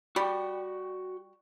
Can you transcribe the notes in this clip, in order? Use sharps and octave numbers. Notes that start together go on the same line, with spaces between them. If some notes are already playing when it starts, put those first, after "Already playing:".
G3 F#4 G5